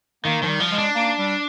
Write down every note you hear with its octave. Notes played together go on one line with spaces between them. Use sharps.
D#3 A#3
D#3 F3
G3
F3
G#3
D4
A#3
G3